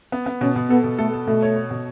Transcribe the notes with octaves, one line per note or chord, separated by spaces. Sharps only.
B3
B3
B2 C#4
B2
B3 A4
B2
A3 A4
A4
B2 A3
C#5
C#5
B2